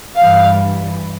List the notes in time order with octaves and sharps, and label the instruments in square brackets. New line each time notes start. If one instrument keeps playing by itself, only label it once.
[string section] G2 E3 G3 F5